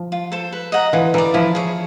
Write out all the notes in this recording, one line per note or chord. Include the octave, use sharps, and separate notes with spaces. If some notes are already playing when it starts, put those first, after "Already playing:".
Already playing: F3
F4
A4 C5
B4
D#5 F#5 A#5
E3 F4
E3 A#4 D5
F3 E4
G#4 C#5